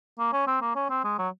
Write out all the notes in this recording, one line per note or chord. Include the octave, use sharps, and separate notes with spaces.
A#3
C#4
C4
A#3
C#4
C4
G#3
F#3